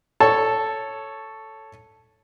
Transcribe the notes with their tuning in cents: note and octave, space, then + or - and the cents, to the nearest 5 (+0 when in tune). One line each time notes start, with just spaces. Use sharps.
A4 +0 C#5 +0 A5 +0